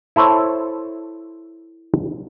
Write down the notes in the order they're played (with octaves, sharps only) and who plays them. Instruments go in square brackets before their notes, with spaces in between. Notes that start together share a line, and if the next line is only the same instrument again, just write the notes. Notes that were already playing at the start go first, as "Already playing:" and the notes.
[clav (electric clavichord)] E4 A4 C5 C#5